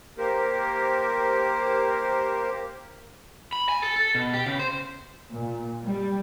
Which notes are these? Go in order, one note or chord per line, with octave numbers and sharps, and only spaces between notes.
A#3 G4 A#4 C5
B5
G#5
A4
A4
B2
G4
C#3
C5
A#2
G3